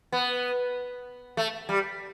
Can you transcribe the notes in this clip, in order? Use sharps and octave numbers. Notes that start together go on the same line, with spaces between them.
B3
A3
G3